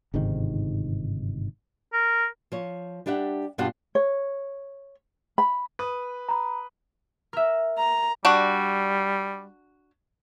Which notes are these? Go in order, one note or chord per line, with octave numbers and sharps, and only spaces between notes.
G1 G#2 C3 D#3
A#4
F3 C#5
G3 D4 G4 E5 F#5
G2 B2 F4 G4 F#5 A5
C#5
B5
B4 D#6
A#5 B5
A#4 E5
A#5
G3 D4 F#4